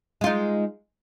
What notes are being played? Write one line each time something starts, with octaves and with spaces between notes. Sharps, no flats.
G#3 D#4 F4